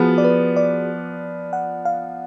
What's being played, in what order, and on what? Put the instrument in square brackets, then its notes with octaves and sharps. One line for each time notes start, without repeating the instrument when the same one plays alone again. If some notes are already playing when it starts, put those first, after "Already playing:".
Already playing: [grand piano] F3 B3 [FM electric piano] F#4 G#4
[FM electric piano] D5
B4
D5
F#5
F5